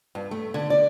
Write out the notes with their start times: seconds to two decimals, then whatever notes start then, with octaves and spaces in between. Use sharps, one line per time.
0.15 G2
0.31 A3
0.54 D3
0.70 D5